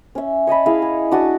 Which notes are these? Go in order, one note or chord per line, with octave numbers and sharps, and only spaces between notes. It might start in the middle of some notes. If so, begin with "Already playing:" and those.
C#4 E5
C#5 D#5 A5 B5
E4 G#4 D#5 F5
G#4
D4 F#4 A5 D#6